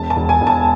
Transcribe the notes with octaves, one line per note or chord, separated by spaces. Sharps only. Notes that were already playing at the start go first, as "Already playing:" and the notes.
Already playing: E1 A5
A5
E1
G#5
E1
A5